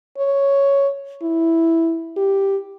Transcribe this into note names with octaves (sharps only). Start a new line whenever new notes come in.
C#5
E4
G4